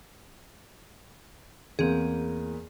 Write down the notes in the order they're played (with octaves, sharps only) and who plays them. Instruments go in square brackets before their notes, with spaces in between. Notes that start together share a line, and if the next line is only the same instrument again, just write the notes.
[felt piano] E2 A#3 [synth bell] C4 G#4